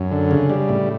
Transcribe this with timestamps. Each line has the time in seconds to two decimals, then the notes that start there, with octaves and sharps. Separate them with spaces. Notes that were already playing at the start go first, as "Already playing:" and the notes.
Already playing: F#2
0.11 D3
0.31 C#3
0.50 G3
0.69 A2